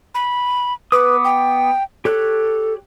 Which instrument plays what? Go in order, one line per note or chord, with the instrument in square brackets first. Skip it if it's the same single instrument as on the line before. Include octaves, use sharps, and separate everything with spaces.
[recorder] B5
[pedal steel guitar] B3 D6 D#6 [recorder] B4
[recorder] G5
[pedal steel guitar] G4 C#5 F#6 [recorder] A4